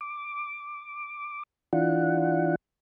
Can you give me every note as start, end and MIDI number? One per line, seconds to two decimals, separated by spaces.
0.01 1.43 86
1.73 2.55 52
1.73 2.55 62
1.73 2.55 65
1.73 2.55 78